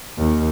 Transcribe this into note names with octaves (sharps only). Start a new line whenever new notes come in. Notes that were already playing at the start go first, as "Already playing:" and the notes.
D#2